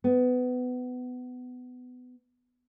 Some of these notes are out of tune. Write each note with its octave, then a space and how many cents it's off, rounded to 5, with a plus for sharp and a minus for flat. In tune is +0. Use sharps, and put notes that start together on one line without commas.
B3 +20